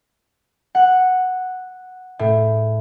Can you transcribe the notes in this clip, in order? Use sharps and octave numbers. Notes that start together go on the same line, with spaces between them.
F#5
A2